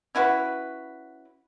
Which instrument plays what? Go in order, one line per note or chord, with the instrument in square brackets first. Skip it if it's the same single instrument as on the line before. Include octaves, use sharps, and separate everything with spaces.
[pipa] C#4 E4 F#4 B4